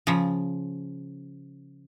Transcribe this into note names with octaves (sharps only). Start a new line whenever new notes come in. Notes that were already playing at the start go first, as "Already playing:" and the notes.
C#3 F3